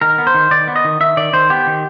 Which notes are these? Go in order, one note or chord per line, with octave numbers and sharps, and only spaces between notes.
D#3 A#4
B3
C5
D#3
D#3 D5
B3
D#5
D#3
D#3 E5
D#3 D5
D#3 C5
B3 G4
D#3